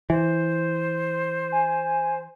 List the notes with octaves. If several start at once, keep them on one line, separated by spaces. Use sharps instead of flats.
E3 C5
G#5